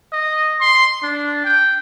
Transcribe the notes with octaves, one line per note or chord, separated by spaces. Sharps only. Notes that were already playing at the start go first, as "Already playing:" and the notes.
D#5
C6
D4
G5